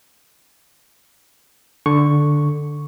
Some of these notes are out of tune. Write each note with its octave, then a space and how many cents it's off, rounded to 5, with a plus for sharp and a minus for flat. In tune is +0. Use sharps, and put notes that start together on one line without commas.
D3 +0 C#6 +0